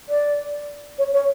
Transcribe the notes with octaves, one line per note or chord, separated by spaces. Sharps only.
D5
C#5
C#5